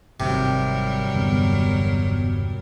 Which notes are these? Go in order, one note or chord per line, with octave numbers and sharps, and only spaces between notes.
G#1 C3 D#3 F#3 G3 C4 A#4
E1 G2 D3 B3